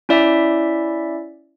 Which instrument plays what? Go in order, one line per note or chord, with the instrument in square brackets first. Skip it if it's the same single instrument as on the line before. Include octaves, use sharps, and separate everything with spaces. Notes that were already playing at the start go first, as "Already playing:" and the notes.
[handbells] C#4 E4 D5 E5